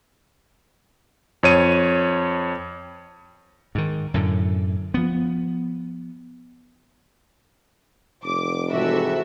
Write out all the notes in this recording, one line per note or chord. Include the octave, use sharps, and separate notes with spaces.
F2 C#5 D#7
G#2 D#3
F#2 A2 D3
F3 B3
F1 D6
G#2 C3 E3 F#4 A4 E5